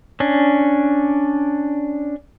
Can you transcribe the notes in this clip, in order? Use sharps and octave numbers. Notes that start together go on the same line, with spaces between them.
C#4 D4